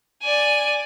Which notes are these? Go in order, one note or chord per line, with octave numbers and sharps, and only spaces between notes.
D5 G#5